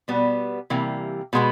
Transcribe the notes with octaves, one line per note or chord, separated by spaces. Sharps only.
B2 G3 B3
C3 E3 G3 A#3
B2 G#3 B3